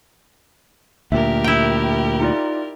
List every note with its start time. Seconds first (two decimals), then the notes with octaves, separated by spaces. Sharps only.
1.12 D2 A#2 G4 A#4 E5
1.44 E4 G5
2.20 D#4 F4 D5